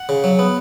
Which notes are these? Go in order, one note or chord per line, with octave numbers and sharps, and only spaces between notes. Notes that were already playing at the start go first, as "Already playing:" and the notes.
Already playing: F#5
C#3
F#3
B3